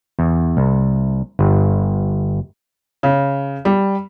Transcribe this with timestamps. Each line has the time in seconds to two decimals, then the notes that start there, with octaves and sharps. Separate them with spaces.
0.19 E2
0.57 C2
1.39 G1
3.03 C#3
3.65 G3